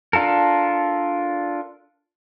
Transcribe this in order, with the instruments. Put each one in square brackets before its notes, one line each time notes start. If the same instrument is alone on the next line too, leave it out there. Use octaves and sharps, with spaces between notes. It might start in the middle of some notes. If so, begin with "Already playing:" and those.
[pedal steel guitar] D4 F4 A4 A#4